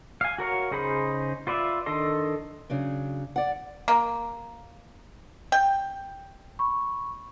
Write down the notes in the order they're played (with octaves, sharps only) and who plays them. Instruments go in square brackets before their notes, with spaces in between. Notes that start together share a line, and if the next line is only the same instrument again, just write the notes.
[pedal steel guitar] F5 G#5
F#4 A#4 C#5 F5
C#3 D#4 G#4 C5 B5
F4 B4 D5 E5
D#3 D4 A4 D#5 C6
[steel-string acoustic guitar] C#3 F#3 D4
D5 F#5
[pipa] A#3
G5
[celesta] B5 C#6